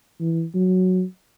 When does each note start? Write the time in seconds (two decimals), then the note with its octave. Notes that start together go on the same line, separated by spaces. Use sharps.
0.20 E3
0.55 F#3